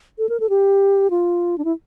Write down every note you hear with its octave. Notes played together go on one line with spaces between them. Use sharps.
A4
A#4
A4
G4
F4
D4
E4